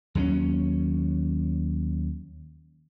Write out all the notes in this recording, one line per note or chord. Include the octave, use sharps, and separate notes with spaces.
D#2 F#3 B3 C#4